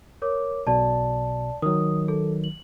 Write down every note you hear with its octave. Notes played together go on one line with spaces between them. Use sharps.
A#4 C#5 D6
B1 B2 D5 A5
D#3 F#3 D#6
A4
F#7